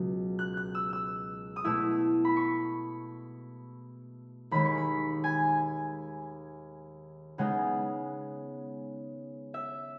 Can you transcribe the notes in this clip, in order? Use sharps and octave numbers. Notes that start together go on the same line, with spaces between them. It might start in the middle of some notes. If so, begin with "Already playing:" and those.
Already playing: C#2 B2 F#3
F#6
F#6
E6
E6
D#6
B2 A3 E4 E6
B5
C#6
D#2 D#3 G#3 B5
C#6
B5
G#5
C#3 G#3 B3 D#4 F#5
E5